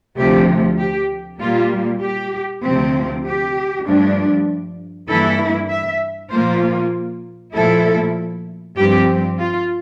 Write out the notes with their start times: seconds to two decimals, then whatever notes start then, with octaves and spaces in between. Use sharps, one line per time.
0.17 D2 C3 F3 A3 G4
0.79 G4
1.40 A#2 G3 A#3 F4
2.02 G4
2.62 D2 C3 F3 C4
3.24 G4
3.86 G2 F3 A3 D4
5.08 G2 E3 A#3 E4 A4
5.70 E5
6.31 A#2 F3 A#3 F4 C5
7.54 A#2 F3 A3 E4 A4
8.77 G2 F3 C4 G4
9.38 F4